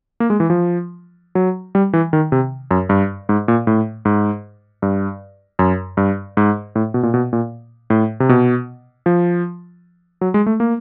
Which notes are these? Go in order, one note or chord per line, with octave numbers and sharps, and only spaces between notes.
A#3
G#3
E3
F3
F#3
G3
E3
D#3
C3
F#2
G2
G#2
A#2
A2
G#2
G2
F#2
G2
G#2
A2
B2
A#2
B2
A#2
A2
C3
B2
F3
F#3
G#3
A3
A#3